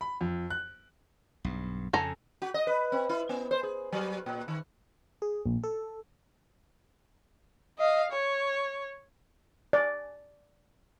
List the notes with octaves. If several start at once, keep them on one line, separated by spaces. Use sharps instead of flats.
B5
F2
F#6
B1 G2
F2 C#3 A4 G#5 A#5
F#4
D#5
B4
C4
E4
B3
C5
G#4
F#3
A#2
D#3
G#4
A#1
A4
D#5 F5
C#5
D5